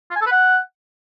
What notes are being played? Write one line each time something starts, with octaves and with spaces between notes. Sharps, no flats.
F4
G#5
A4
B4
F#5